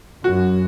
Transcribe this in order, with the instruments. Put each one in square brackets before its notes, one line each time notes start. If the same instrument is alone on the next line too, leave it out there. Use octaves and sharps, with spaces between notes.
[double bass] F#2 [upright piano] F#4